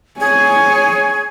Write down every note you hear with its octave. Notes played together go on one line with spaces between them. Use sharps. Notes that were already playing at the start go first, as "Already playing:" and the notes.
G#4 C#5 G#5